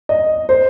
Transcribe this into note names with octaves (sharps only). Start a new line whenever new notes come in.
D#5
C5